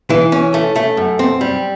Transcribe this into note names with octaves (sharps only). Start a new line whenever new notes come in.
E3
C#4
A3
A3
F#2
C4
G3